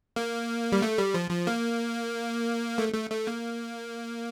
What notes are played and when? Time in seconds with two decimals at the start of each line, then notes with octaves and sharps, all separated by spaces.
0.16 A#3
0.72 G3
0.82 A3
0.98 G3
1.14 F3
1.31 F3
1.47 A#3
2.78 A3
2.94 A3
3.10 A3
3.27 A#3